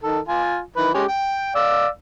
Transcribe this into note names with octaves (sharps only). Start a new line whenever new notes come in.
D#3 A4
F4 G#5
D#3 E3 B4
G#3 C#4 G4
G5
D5 F5 E6